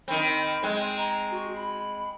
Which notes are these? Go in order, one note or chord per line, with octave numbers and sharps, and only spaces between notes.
D#3 C4 B5
G#3 C4
A#5
F#4
B5